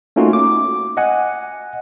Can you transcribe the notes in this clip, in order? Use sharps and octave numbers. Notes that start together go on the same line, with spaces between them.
A3 A#3 C#4 D#4 F4 F#4
D6
D#5 F#5 G#5